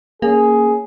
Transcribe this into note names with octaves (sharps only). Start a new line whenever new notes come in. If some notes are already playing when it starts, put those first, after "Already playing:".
A#3 C#4 G#4